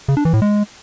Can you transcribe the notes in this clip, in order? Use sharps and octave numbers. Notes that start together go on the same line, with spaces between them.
C#3
D4
E3
A2
G#3